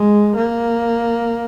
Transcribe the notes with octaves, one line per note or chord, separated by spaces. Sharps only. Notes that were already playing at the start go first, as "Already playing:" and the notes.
Already playing: G#3
A#3